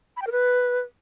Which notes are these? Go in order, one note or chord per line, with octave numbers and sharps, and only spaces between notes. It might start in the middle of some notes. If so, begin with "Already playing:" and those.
B5
G5
A#4
B4